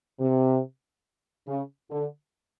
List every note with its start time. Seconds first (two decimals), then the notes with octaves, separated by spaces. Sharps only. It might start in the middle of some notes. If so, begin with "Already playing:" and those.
0.20 C3
1.47 C#3
1.91 D3